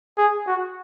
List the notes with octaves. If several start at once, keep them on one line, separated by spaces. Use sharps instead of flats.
G#4
F#4